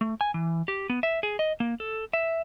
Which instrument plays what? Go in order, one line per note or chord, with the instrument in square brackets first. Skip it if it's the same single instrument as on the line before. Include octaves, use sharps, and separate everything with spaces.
[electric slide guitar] A3
G#5
E3
G4
B3
E5
G#4
D#5
A#3
A4
E5